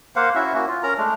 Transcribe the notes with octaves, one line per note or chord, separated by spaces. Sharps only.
A#3 C5 F5 F#5
C#4 E4 F#4 E5
A#3 C#4 F#4
F4
C#4 A#4 A#5
G#3 A3 D4